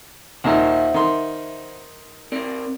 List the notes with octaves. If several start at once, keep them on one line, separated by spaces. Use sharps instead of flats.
D#2 A#2 D#3 C5 E5 F#5
D#3 C6
C4 A#4 D5